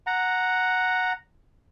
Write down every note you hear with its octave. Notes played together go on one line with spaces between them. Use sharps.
F#5 A#5